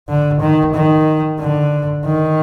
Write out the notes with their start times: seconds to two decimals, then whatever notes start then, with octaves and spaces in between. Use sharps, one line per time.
0.08 D3
0.41 D#3
0.74 D#3
1.39 D3
2.06 D#3